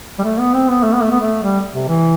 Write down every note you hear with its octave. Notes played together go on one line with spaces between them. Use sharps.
G3
A3
B3
C4
B3
A3
B3
A3
B3
A3
G3
C3
E3